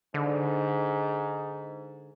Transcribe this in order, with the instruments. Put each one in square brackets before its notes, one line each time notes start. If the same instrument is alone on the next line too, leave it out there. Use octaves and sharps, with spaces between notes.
[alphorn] G#2 [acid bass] D3